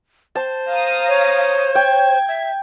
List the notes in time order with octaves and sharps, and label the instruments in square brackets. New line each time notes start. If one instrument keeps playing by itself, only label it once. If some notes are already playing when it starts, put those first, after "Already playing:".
[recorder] C5 [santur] A5
[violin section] F5 A#5 D#6
[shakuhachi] C#5
[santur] G5 [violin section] G#6
[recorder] E5